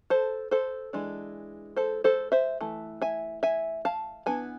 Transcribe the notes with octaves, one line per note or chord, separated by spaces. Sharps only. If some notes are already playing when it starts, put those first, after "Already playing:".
A4 C5
A4 C5
E3 G#3 D4
A4 C5
A4 C5
C5 E5
E3 A3
E5 G#5
E5 G#5
F5 A5
E3 B3 D4 G#5